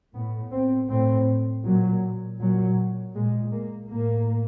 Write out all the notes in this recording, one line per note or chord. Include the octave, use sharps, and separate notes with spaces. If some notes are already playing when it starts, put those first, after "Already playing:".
A2 B3
C4
A2 C4
A#2 F#3
A#2 F#3
A#2 G#3
A#3
A2 A#3